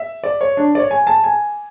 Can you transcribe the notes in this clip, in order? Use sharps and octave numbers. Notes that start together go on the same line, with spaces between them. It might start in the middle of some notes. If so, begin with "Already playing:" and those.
Already playing: E5
D5
C#5
D4
D5
C#5
G#5
A5
G#5